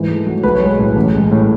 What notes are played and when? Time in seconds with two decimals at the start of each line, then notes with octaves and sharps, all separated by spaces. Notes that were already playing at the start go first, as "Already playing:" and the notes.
Already playing: G#2 E3
0.09 A3
0.27 F#3
0.43 B1 B4
0.55 C#5
0.61 G#3 B4
0.79 A2
0.96 A1
1.13 G#3
1.31 A2